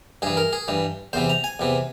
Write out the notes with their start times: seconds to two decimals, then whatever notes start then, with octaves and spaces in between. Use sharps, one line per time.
0.22 G2 E3 G#4
0.37 A#4
0.53 G#4
0.68 G2 E3
1.13 E2 C3 E3 C5
1.30 A#5
1.44 G#5
1.59 E2 C3 E3